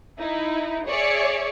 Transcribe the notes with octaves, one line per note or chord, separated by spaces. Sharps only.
D#4 E4
G#4 C#5 D5 E5 C#7